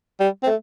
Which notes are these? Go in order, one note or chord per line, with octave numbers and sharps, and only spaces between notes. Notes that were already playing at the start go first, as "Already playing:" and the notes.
G3
C4
A3